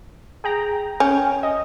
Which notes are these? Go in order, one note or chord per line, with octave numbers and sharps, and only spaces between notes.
G#4 G5 A#5
C#4 G5
D#5